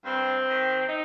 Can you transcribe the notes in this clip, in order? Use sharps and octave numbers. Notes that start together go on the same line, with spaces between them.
G2 C4
D#3
D#4